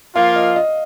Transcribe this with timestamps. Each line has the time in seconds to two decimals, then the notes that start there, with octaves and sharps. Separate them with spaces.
0.15 F3 A#3 F4 F5
0.36 D#5
0.56 D#5